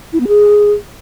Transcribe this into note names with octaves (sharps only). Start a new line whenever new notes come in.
E4
B3
G#4